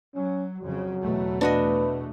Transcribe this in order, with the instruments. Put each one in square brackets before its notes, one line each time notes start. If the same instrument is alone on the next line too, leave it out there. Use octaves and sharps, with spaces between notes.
[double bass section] F#3 [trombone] C#4
[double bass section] F2 C#3 [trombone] F#3
[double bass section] E2 B2 A3
[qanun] D4 F#4 D#5 [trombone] B4